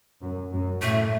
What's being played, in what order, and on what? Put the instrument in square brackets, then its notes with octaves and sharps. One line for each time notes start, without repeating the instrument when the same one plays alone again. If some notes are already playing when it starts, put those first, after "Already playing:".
[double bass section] F#2
F#2
[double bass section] A2 [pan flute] A3